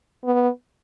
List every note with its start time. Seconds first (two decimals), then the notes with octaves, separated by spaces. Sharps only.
0.24 B3